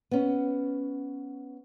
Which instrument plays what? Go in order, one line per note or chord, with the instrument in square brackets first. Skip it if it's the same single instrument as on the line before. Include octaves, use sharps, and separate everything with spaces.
[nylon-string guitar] B3 C#4